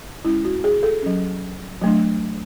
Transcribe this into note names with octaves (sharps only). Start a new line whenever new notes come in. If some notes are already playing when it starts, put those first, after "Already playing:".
G#3 C#4 E4
F#4
G#4
A4
F#3 C#4
F#3 A3 D4